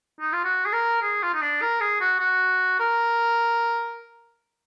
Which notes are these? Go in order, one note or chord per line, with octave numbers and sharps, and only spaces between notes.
D#4
F4
F#4
G#4
A#4
G#4
F4
D#4
D4
A#4
G#4
F#4
F#4
A#4